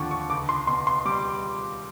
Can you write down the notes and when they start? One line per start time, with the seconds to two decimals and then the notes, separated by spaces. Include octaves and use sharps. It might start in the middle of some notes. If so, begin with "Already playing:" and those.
Already playing: D#2 D3 F3 C#6 D6
0.11 C#6
0.30 C#2 D6
0.49 C6
0.67 B2 C6
0.87 C6
1.05 G3 D6